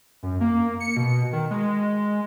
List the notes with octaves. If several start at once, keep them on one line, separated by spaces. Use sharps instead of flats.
F#2
A#3
C#7
B2
D#3
G#3